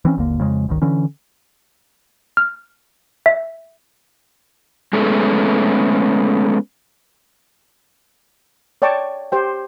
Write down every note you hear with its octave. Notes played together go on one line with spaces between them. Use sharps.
E3 C4 C#4
G#1 D#2 D3 A#3
F2 C#3 G#3
G1 C#2 D#3
D3 E3 C#4
F6
E5
G#3 A3 B3 C#4 G#4 A4
C#5 D5 G5 A5 C#6 D6
G4 C5 G5